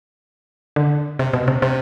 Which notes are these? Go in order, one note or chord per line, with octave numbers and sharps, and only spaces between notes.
D3
C3
B2
C3
C3